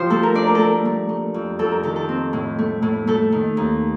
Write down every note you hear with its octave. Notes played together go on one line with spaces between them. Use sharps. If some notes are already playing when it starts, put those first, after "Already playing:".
Already playing: F3 F4 G4 C5
A3 A4
A#4
D4 D5
A#4
A4
A3 A#4
A3
A3
F2
F2 A4
A#4
D#3 A4
A4
C4
A2
A3
A2
A3 A4
D#3
D#2